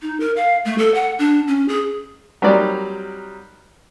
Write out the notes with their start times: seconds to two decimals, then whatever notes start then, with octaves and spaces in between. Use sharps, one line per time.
0.02 D#4
0.20 A#4
0.36 F5
0.65 A3
0.78 A4
0.94 F#5
1.19 D4
1.48 C#4
1.69 G#4
2.42 F#3 G3 C4 D#4 A#4 D5